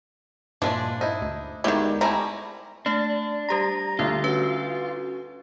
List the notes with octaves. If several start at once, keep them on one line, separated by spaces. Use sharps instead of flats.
G2 A#2 E3 F3 G#3 D4
D#4 E4 C5 D#5
D2
D#3 G3 G#3 B3 D#4 E4 F#4
C3 G3 A3 E4 G#5 A#5
A3 D4
G3 G4 A#5 A#6
D2 F4
C#4 F#4 B4